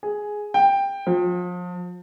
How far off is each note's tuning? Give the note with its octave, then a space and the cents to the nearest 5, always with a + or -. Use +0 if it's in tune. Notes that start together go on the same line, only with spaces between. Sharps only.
G#4 +5
G5 +10
F3 +35